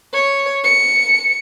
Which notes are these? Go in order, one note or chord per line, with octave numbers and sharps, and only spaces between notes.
C#5
C#7